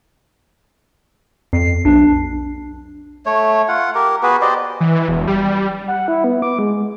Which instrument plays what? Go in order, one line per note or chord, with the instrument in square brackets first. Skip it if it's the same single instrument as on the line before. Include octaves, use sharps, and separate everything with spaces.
[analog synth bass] F2 [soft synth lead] C7
[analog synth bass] B1 [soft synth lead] D4
[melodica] A3 C#5
F4 F#5
G4 A#4
B3 F#4 G#4 B4
G4 C5 D5 D#5
[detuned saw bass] E3
E1
G3
[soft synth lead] F#5
E4
B3
D6
G#3